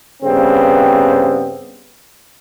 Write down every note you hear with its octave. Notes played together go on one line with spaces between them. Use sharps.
G2 C#3 B3 C4